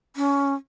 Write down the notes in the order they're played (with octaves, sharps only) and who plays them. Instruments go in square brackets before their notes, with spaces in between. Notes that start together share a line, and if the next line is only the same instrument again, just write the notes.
[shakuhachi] C#4